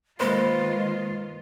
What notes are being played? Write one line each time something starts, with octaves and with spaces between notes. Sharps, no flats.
D#3 G#3 A#3 F4 B4 C5